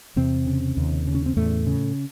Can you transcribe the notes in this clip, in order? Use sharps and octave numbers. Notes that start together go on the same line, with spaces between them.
E2 C3 C4
C#3
D#2
C#3
C#4
C4
E2 A2 A3
C#3